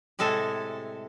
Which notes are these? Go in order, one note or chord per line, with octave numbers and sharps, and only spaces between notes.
A2 C3 G#3 A4 G#5 A5